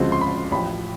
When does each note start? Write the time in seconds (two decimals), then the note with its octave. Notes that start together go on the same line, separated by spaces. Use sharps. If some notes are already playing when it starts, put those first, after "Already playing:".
Already playing: D2 C#3 F3 G#3 C4
0.12 C6
0.21 B5
0.51 A1 A2 F3 B5